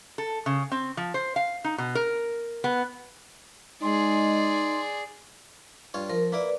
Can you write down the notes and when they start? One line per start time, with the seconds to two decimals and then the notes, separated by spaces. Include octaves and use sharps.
0.18 A4
0.46 C#3
0.72 C4
0.97 F3
1.14 C5
1.36 F5
1.64 D#4
1.78 B2
1.95 A#4
2.64 B3
3.82 G#3 D#4 G#4 D5 C6
5.94 G2 F4 C#5
6.10 F3 A#4
6.32 A#3 E4 B4 D5